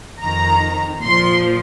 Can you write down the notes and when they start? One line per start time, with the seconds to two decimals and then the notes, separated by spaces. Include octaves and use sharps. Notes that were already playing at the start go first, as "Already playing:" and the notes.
0.21 F2 D#3 A#5
1.04 A#2 F3 C6